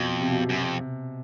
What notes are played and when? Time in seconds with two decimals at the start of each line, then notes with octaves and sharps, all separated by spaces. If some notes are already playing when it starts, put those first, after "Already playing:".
Already playing: F2 B2
0.20 C3
0.31 B2
0.40 C3
0.49 F#2
0.63 F2
0.79 C3